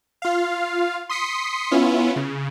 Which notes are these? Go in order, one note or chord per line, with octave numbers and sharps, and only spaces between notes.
F4 F5
C6 D#6 B6 C#7
B3 C#4 E4 F4
C#3